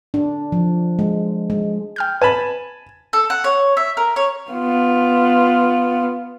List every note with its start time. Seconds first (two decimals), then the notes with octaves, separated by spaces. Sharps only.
0.14 D4
0.52 F3
0.99 G#3
1.50 G#3
1.96 G5 F6 G6
2.22 B4 G#5 A5 B5
3.13 A4
3.30 F#5
3.44 C#5
3.77 E5
3.97 A#4
4.16 C#5
4.51 B3 F4